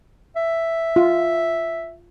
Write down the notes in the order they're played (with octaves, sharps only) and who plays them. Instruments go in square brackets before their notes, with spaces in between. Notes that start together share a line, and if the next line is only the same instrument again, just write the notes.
[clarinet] E5
[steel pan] F4